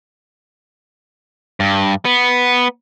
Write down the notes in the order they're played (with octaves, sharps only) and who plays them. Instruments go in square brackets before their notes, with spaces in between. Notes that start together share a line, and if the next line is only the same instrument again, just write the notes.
[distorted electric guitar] G2
B3